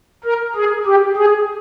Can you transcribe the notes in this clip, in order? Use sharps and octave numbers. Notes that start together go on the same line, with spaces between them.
A#4
G#4
G4
G#4